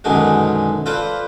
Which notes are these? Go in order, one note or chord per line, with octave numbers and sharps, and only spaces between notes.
F#2 B2 D3 D#3 G#3 D4
F4 A4 B4 C5 D5